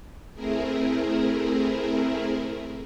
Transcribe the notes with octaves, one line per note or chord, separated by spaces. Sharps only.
A3 C4 E4 G#4 A#4